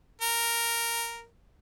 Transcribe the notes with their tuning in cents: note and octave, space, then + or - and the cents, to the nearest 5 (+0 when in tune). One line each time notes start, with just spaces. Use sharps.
A#4 -5